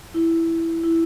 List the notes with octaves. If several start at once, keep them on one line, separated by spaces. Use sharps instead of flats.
E4
E4